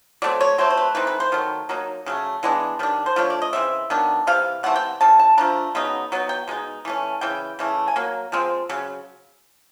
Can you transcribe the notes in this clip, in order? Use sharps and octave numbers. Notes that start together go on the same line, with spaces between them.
F#3 A3 C4 D5
C#5
F#3 A3 C4 C5
C5
B4
E3 A3 C4 D#4 B4
B4
C5
D#3 F#3 A3
F#3 A#3 D#4
C#3 F#3 A3
E3 G#3 B3 D4
D#3 G3 D4
C5
F3 A3 D4 C#5
D5
D#5
C#3 E3 C4 E5
D#3 F#3 B3 D4
C3 E3 F5
C3 E3 A3 C4 F#5
G5
C#3 E3 A5
A5
F3 A3 D4 A#5
C#3 F#3 B3 D#4
F#3 B3 D#4
G5
B2 G#3 D#4
E3 A3 C#4
C#3 E3 G5
C#3 E3 A3
G#5
F#3 A#3
F3 G#3 C4
C#3 F#3